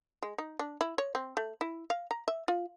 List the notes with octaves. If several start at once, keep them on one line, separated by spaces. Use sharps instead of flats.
G#3
D#4
D4
E4
C#5
C4
A3
E4
F5
A#5
E5
F4